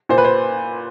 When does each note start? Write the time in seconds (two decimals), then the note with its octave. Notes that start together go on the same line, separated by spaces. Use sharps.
0.09 A#2 C5
0.18 B4
0.25 C5